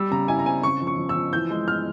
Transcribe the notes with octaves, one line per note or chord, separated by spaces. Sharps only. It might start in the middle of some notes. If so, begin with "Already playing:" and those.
Already playing: G3 E6
C#3 A#5
E4 G#5
A#5
C4 G#5
C#3 C#6
F3
C#6
F3
E6
F3
E3 G6
G#3
G#3 F6